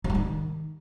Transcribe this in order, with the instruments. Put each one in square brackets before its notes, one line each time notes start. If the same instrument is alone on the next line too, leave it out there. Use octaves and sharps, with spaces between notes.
[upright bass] F#3
G3
D#3